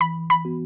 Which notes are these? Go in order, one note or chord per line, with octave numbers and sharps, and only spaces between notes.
E3 B5
B5
B3 F#4